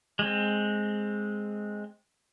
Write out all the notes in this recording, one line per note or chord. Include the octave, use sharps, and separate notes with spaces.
G#3 C4